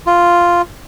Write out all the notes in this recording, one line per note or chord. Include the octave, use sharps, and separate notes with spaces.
F4